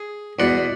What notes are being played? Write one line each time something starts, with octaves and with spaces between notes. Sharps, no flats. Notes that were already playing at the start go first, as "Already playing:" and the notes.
Already playing: G#4
E2 B2 D5 F#5